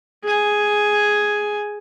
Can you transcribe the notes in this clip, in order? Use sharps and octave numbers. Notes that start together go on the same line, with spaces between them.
G#4 G#5